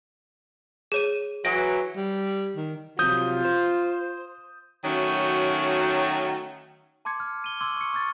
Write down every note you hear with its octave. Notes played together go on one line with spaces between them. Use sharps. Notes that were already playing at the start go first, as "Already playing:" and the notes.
G#4 C#5 D#7
E3 F#3 A#6 D7
G3
D#3
C3 F3 F#3 F4 D#6 G6
C5
D#3 F#3 A3 C#4 F#4
A5 C6 D6 G#6 C#7
F6
D#7 G7
C6 D6 E6 G#6
C#6 C#7
C#6 F6 G#6 A6